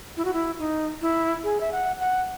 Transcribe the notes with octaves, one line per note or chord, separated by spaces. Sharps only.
E4
F#4
E4
D#4
E4
G#4
E5
F#5
F#5